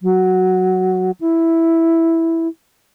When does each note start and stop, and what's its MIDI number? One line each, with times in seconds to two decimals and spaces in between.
0.01 1.11 54
1.20 2.47 64